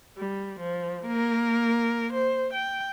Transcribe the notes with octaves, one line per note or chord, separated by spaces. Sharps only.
G3
F3
A#3 A#4
C5
G5